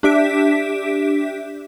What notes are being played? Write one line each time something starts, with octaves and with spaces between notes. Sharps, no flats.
D4 G4 E5 B6 D7